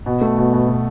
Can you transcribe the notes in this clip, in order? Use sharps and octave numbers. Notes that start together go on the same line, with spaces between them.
B2
A3
B2
B2
B2